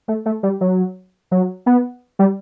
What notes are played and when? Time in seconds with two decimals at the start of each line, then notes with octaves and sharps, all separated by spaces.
0.08 A3
0.26 A3
0.43 G3
0.61 F#3
1.31 F#3
1.66 B3
2.19 G3